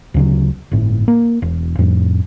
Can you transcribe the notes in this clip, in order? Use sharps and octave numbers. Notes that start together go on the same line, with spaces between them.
D2 C#3 F#3
G1 A2
A#3
E1
F2 A2